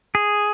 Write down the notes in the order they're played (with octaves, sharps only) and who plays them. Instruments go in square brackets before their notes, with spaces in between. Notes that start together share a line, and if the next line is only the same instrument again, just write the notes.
[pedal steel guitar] G#4